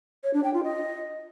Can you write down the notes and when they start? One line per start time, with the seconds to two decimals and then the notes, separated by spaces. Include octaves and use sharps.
0.24 C#5
0.34 D4
0.44 G5
0.54 F4
0.64 D#5